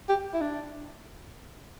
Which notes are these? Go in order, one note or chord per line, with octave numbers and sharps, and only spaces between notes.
G4
E4
D4